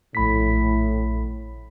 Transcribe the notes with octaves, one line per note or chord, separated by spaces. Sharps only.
A#1 A2 B5 B6